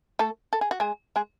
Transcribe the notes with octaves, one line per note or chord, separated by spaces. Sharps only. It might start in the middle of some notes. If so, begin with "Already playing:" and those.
A3 A4
A4
G#4
F#4
G#3 G#4
G#3 G#4